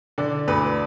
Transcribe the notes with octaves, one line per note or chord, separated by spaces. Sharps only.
D3 D5
D2 B4